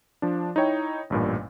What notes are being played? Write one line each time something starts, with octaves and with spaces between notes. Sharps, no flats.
F3 D4
D#4 E4 C#5 G5
A1 G2 A#2